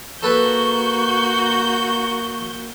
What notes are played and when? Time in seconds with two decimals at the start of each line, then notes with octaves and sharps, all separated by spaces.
0.23 A#3 F#4 A4 B4 C#6 G6